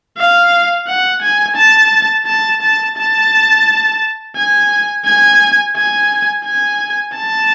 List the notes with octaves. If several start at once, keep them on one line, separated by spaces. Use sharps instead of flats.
F5
F#5
G#5
A5
A5
A5
A5
G#5
G#5
G#5
G#5
A5